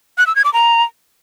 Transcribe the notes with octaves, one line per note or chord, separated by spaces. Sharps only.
F#6
E6
G#6
D6
A#5